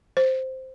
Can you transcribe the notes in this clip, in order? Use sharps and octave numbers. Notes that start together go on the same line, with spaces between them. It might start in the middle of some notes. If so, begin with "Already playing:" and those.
C5